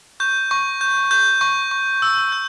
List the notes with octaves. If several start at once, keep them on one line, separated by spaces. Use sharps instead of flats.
C#6 G6
C#6
G6
G6
C#6
C#6
E6
G6